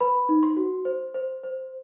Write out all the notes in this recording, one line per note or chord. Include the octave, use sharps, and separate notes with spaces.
B4 B5
D#4
C6
F#4
C5
C5
C5